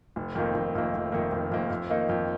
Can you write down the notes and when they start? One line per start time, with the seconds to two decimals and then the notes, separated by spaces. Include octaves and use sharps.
0.16 F1
0.35 F2 D#3 A#3
0.55 F1
0.75 F2 D#3 A#3
0.94 F1
1.12 F2 D#3 A#3
1.32 F1
1.52 F2 D#3 A#3
1.70 F2
1.90 D#3 A#3 D#4
2.09 F2